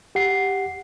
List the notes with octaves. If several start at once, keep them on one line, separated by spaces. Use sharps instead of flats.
G4 F#5 C7